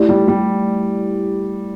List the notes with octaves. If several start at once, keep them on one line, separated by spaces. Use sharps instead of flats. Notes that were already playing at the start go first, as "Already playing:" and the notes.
Already playing: A3 E4 G4 D5
G3
G3